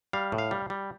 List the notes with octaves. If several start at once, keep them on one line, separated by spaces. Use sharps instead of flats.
G3 F5
A2
F5
G3
G3